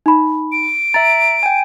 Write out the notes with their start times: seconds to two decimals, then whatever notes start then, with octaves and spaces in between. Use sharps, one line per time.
0.06 D#4 B5
0.52 D7
0.94 E5 A#5 A6
1.43 G5 G#5